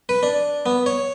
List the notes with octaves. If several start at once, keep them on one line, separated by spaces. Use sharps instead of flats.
B4
D4
B3
C#5